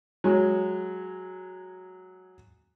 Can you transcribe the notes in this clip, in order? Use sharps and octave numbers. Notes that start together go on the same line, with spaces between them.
F#3 G#3